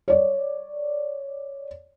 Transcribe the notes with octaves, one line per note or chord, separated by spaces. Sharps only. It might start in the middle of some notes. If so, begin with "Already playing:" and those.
C#5 D5